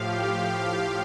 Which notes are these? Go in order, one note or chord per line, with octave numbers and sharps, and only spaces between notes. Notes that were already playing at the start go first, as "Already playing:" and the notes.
Already playing: A2 F3 G4 F5